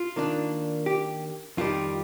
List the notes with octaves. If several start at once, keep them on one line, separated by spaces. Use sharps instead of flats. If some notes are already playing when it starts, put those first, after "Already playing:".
Already playing: F4
D#3 A#3 D4
G4
F2 D#3 G3 F4